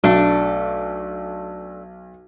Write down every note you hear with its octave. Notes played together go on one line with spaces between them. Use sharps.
B1 A3 D4